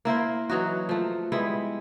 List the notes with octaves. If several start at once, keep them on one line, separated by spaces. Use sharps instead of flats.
A#3 E4 A#4 C5
E3 F#3 D#4 F#4
F3 A3
G3 G#3 B3 E4